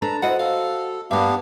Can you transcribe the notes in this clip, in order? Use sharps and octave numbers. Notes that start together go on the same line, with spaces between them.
D4 A4 B4 A#5
E4 F#4 C5 D#5 F#5
A4 F5
G2 A#3 B3 D4 G4 F5